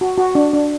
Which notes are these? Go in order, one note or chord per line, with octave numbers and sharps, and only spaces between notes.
F#4
F#4
D4
D4